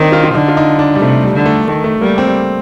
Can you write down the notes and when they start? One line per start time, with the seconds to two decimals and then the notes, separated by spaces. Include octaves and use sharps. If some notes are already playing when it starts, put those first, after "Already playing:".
Already playing: D#3 C4 D4 D#4
0.12 F4
0.24 F4
0.34 D3 D#4
0.48 F4
0.57 D#4
0.79 D4
0.95 G3
1.01 C3 A3
1.23 G3
1.34 D3
1.46 A3
1.68 D#3 A3
1.84 A3
2.01 G3 A#3
2.18 C4